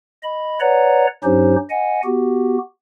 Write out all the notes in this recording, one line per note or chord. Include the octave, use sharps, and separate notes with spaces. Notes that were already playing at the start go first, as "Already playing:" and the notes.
D#5 B5
B4 C#5 D5 F#5 A#5
G2 F#3 C#4 D#4 G4 C5
D#5 F#5 G#5
B3 F#4 G4